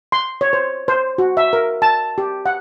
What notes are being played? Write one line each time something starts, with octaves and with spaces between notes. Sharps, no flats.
C6
C#5
C5
C5
F#4
E5
A#4
A5
G4
F#5